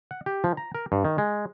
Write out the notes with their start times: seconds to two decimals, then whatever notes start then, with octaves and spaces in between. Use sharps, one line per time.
0.11 F#5
0.26 G4
0.44 F3
0.57 A#5
0.75 A#4
0.92 G2
1.05 D#3
1.18 G#3